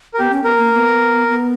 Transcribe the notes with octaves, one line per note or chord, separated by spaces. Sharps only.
A#4
B3 G4
C#4
B3 A#4
A#3
B3
B3